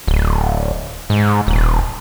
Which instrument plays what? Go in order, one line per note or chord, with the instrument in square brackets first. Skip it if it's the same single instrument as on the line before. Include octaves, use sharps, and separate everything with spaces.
[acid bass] D1
G#2
D#1